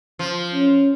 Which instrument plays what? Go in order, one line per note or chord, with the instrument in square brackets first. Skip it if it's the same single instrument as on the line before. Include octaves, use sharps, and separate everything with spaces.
[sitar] F3
[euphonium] C#4